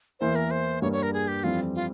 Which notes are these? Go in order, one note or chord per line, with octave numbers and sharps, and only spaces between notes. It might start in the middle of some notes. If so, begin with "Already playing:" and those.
E2 E3 A#3 E4 C5
A#4
C5
G2 G3 A#3 C#5
C#5
A#4
G#4
G4
F2 E3 G3 C4 F4
F4